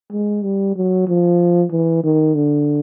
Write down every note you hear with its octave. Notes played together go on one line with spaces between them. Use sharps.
G#3
G3
F#3
F3
E3
D#3
D3